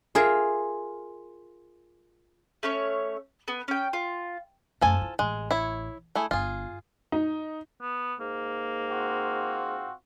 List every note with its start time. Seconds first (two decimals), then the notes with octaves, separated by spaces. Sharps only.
0.15 F4 G#4 A#4 E5
2.63 A3 C#4 C#5
3.48 B3
3.68 C#4 G5
3.93 F4
4.81 F#2 F3 A3 A4 G#5
5.01 E4
5.19 A1 G#3
5.51 E4 C#5
6.15 A3 E4 G#4
6.31 G1 F4 G#4
7.12 D#4
7.81 B3
8.20 G#2 A#3
8.91 C4 F4 F#4